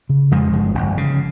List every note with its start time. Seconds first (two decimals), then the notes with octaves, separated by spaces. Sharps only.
0.09 C#3
0.31 F2 F3 G#3
0.53 G1
0.75 G1
0.97 C#3